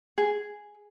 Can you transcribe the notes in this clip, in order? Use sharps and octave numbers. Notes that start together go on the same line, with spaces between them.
G#4